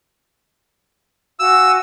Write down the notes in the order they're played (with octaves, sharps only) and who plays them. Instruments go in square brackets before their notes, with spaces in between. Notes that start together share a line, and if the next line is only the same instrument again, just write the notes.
[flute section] F#4 F5 G#5 [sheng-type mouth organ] E6